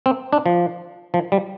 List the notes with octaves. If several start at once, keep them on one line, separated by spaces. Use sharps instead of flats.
C4
D4
F3
F3
G3